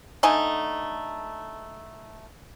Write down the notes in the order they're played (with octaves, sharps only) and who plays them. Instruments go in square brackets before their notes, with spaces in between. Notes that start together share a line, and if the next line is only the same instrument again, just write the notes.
[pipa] D3 A3 D#4 G#5